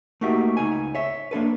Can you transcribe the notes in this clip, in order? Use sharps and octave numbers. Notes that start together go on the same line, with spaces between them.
A3 A#3 D#4 F#4 G4 E5
C#2 D#4 G#5
C#5 E5
A#3 D4 A4 B4